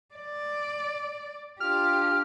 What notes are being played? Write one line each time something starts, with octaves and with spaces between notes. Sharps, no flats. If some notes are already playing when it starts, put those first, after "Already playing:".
D5
D4 F4 G4 F6